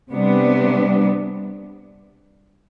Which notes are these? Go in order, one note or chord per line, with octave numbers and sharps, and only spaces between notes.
C3 G3 B3 D4